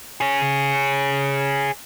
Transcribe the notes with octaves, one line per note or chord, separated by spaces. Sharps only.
G#4 C#5